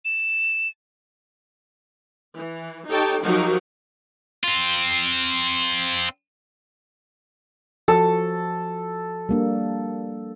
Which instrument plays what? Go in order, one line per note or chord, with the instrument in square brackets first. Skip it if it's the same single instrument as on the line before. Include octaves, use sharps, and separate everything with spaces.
[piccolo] E7
[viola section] E3
D#4 G4 A4 C#5 G5 A5
F3 F#3 D#4 F#4 G4 A#4
[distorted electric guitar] C4 F4
[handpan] F3 F#4 [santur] A4
[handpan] G3 A#3 D4